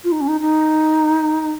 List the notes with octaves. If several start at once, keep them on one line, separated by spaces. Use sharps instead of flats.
F4
D#4
C#4
D#4
D#4